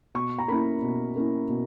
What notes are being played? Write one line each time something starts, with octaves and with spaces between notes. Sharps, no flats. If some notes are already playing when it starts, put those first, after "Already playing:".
B2 C#6
A#5
A#3 C#4 E4 B5
B2
A#3 C#4 E4
B2